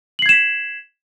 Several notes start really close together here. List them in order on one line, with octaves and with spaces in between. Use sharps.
F#7 C7 G#6 E7 B6